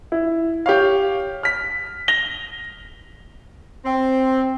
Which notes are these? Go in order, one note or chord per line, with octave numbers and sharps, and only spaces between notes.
E4
G4 C#5 F5
F6 B6
A#6 F7 G7
C4